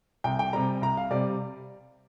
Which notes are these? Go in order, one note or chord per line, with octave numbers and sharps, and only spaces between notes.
C2 G5
G5
C3 G3 A#5
C2 A#5
F5
C3 G3 D5